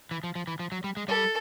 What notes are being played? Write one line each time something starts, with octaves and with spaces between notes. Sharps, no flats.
E3
F3
F3
E3
F3
F#3
G3
G#3
G3 A4